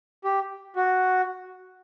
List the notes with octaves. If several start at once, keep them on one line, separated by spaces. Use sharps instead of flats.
G4
F#4